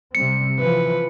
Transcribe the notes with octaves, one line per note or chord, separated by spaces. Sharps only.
C3 G3 C4 C#7
E3 F3 B4